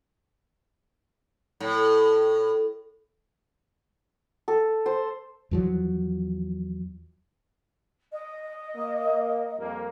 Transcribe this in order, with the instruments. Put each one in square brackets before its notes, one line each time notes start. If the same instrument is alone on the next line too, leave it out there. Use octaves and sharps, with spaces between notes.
[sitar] A2
[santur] A4
C5
[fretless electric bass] E2 F3 F#3
[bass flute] D#5
[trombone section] A#3
F2 G3 A#3